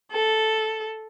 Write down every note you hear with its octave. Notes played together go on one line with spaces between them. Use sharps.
A4